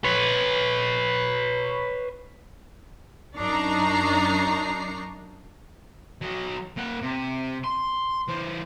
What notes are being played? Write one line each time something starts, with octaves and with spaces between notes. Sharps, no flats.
B4 C#5
F#2 D4 D#4 A#5 C#6 C7
F#3 D#5
A#3 F#5
C3
C6
E3 C5